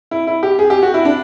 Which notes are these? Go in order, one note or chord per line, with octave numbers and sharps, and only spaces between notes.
E4
E4
G4
G#4
G4
F#4
E4
D4